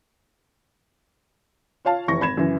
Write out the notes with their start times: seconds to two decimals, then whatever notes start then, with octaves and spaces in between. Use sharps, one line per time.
1.85 F4 C#5 F5 A5
2.08 F1 E3 C#6 A#6
2.20 G#1 B5 G#6 E7
2.37 F#2 C#3 E3